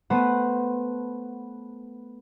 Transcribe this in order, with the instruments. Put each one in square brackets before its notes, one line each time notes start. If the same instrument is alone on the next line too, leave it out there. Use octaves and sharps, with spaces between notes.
[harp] A3 B3 B4 C5 F#5